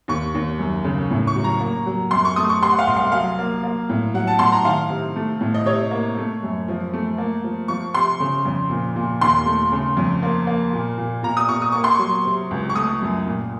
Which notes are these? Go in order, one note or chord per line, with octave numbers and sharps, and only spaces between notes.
D#2 C#6
D#2
F#2
C#3
A2
C#6
F#3
A#5
A#3
F#3
F#2 C6
C#6
A3 D#6
C#6
C3 C6
F#5
F5
C2
F5
F#5
F#3 F5
A#3
A#3
A2
F#3 F#5
A5
A2 C6
A#5
D#3 F5
C3
A3
A2
D#5
C3 C#5
A#3
A3
F#2
F3
A3
A#3
F3
F3 C#6
C3 C6
C#3
F2
A#2
A#2
D#2 C6
A3
C#3
F2
A#3
A#3
A#2
A#2
A#2 A#5
D#6
A#2 C#6
D#6
A#3 C#6
C6
F#3 C#6
C3
C#2
C#6
A3 D#6
F#2
A#2